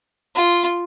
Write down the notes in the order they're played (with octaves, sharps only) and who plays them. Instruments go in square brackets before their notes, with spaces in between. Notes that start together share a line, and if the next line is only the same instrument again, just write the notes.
[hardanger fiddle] F4